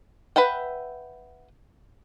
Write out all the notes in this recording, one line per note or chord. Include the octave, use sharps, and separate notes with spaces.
B4 E5 F#5 G5